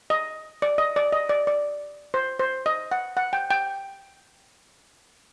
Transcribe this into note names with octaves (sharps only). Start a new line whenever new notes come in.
D#5
D5
D#5
D5
D#5
D5
D5
C5
C5
D#5
F#5
F#5
G5
G5